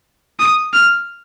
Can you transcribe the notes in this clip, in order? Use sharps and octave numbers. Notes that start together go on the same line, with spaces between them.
D#6
F6